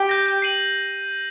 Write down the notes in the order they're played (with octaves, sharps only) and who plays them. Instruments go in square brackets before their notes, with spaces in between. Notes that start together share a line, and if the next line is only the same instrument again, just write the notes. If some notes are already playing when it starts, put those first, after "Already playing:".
Already playing: [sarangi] G4
[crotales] G6 A#6
G6
C7 D#7 F#7